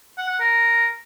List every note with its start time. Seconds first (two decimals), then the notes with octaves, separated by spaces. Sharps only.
0.18 F#5
0.29 F#5
0.40 A#4